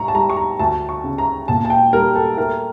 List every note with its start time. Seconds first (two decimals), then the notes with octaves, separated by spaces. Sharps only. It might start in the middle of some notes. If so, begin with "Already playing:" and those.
Already playing: A2 G3 A#5 C#6
0.08 A5
0.14 G3 A#5
0.30 C#6
0.37 A#5
0.59 D2 A5
0.89 C#6
1.04 C#3
1.18 A#5
1.48 A#2 A5
1.65 A5
1.70 G5
1.93 G3 A#4
2.16 A4
2.37 A3 A#4